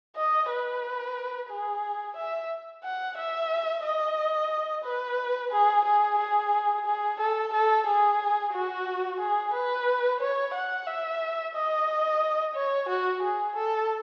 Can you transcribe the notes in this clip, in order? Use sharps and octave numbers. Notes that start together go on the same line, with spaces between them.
D#5
B4
G#4
E5
F#5
E5
D#5
B4
G#4
G#4
G#4
G#4
A4
A4
G#4
F#4
G#4
B4
C#5
F#5
E5
D#5
C#5
F#4
G#4
A4